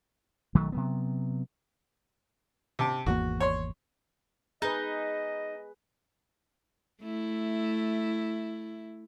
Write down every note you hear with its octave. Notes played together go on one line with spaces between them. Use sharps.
B1 D#3 F#3 A3
C3 F#3 B3
C3 A5
G#1 E2 A#3 F#4
C#5 C6
D#4 G#4 B4 D#5
A3 E4